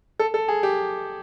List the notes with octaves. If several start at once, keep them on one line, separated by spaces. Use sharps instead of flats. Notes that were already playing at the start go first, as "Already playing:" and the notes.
A4
A4
G#4
G4